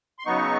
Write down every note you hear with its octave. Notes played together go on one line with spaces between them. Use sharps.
C6
C#3 F#3 B3 D#4 C#6